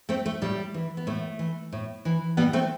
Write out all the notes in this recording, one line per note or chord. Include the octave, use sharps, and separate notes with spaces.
A3 C4
A3
A2 G3
E3
B3
A2 A3
E3
A2
E3
A2 G3 B3
A3 C4